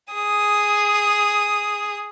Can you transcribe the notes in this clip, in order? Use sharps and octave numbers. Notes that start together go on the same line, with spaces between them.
G#4 D#6